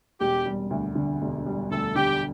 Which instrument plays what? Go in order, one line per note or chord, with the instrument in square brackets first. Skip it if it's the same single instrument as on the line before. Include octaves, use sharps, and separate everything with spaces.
[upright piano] E1 [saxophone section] G4
[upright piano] G3
D2
D3
E1
G3
[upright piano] D2 [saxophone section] A4
[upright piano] D3 [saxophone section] G4